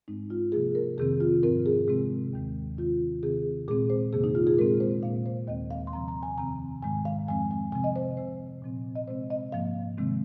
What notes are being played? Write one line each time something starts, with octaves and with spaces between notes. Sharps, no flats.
G#2 G#3 C4 D#4
F4
C3 F3 A#3 G#4
A#4
F2 C3 D#3 C4 G#4
F4
G#2 F3 C4 A#4
G#4
C3 G#3 C4
D#2 D#3 G#3
C3 D#3 C4 F4
C3 D#3 C4 G#4
A#2 G#3 C4 G#4
C5
F2 C3 D#3 A#3 G#4
D#4
F4
G#4
A#2 G#3 C4 A#4
C5
A#2 A#3 F5
C5
D#2 D#3 G#3 C4 D#5
F5
C6
C3 F3 C4 A#5
A#5
G#5
F2 C3 D#3 C4 A#5
G#2 D#3 G#3 G#5
F5
F2 F3 G#3 C4 G#5
G#5
C3 F3 C4 G#5
D#5
C5
C3 F3 C4 C5
A#2 F3 C4
D#5
C3 G#3 C4 C5
D#5
G#2 F3 A#3 F5
C3 D#3 G#3 C4